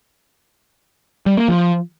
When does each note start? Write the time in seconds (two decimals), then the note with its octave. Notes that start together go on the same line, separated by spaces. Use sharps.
1.26 G3
1.37 A#3
1.48 F3